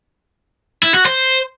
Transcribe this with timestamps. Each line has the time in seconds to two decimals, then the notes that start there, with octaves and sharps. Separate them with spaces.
0.83 E4
0.94 F#4
1.06 C5